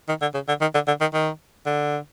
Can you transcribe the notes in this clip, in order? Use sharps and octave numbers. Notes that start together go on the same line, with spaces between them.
D#3
D3
C#3
D3
D#3
D3
D3
D#3
D#3
D3